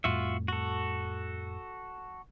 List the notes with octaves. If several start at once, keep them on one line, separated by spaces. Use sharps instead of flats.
F2 A2 G3 F4 F#4 E5
F#4 A4